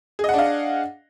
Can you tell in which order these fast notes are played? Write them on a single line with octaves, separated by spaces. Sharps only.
G#4 D#5 F#5 D4 F5